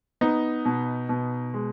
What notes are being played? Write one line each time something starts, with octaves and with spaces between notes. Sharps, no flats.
B3 D#4
B2
B2
G#3